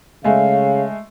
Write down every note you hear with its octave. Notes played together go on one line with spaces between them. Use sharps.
C#3 G#3 A3 F5